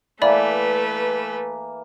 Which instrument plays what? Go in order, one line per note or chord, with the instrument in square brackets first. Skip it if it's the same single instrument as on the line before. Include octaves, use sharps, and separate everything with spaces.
[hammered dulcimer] E3 A#3 [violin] A3 B4 [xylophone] D5 E5 B5